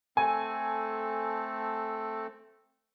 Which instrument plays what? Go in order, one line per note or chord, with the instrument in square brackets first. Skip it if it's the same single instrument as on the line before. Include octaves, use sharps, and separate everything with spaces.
[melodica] A3 C4 A4 [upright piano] G#5